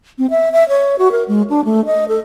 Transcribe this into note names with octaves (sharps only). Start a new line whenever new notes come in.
C4
E5
E5
C#5
F#4
A#4
G#3
D4
A3
D#5
A4